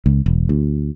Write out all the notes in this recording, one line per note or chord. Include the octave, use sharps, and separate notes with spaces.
C#2
E1
D2